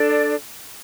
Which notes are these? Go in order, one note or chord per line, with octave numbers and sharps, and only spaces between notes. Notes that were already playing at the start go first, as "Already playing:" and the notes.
Already playing: D4 A4 D5